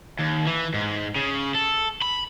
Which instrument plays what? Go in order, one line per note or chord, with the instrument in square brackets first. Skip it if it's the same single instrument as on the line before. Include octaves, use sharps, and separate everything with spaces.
[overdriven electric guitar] D#2
E3
G#2
C#3
A4
B5